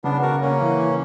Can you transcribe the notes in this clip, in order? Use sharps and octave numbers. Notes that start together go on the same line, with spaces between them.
C#3 B3 D4
F#4 A#4
C#3
A#3 C#4
E3
E3